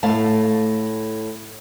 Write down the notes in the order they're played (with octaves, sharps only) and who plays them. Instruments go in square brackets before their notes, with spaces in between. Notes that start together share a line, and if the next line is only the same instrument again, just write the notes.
[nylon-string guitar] A2 A3 F5 A5